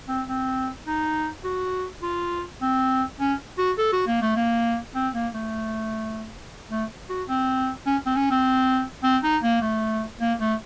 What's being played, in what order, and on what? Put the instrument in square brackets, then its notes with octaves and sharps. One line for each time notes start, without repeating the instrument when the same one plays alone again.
[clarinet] C4
C4
D#4
F#4
F4
C4
C#4
F#4
A4
F#4
A#3
A3
A#3
C4
A#3
A3
A3
F#4
C4
C#4
C4
C#4
C4
C4
D#4
A#3
A3
A#3
A3